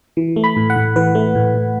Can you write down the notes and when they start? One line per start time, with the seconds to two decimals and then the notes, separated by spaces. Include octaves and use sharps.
0.17 E3
0.36 A3
0.44 B5
0.57 A2
0.70 F#5
0.76 A2
0.96 E3 B4
1.15 A3
1.35 A2
1.54 A2